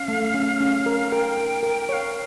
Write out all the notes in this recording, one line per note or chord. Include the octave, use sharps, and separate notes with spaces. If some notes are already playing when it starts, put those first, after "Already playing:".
Already playing: C#4 F5
A3
C#4
C#4
A#4
A#4 G5
A#4
A#4
C#5 F5 G5